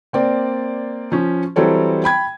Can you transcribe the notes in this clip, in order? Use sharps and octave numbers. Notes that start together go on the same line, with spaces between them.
A#3 C4 D5
F3 C#4
E3 F#3 G3 C4 A4 C#5
G5 B5 G#6